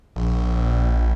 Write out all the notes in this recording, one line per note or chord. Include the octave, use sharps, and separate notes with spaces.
A#1